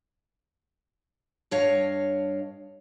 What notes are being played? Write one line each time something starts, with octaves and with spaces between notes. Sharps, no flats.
G2 D4 C#5 D#5 F5